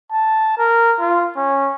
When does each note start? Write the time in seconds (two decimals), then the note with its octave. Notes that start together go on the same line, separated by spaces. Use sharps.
0.11 A5
0.58 A#4
1.00 F4
1.37 C#4